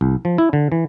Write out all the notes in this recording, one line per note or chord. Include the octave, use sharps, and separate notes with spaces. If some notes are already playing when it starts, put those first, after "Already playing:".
C2
F3
E4
D3
E3